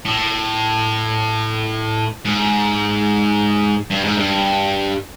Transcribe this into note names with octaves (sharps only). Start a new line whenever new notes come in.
A2
G#2
G2
G#2
G2